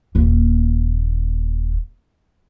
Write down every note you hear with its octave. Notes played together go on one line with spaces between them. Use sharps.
D#1 A#3